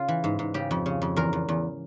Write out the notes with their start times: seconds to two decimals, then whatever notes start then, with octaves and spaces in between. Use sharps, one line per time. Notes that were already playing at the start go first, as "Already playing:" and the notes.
Already playing: C#3 F4
0.08 E3
0.24 G#2
0.39 G#2
0.54 C#3 G4
0.71 F2
0.86 C#3
1.02 F2
1.16 E2 A#4
1.33 E2
1.49 E2